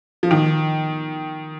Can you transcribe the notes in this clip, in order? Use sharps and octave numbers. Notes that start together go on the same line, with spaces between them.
F3
D#3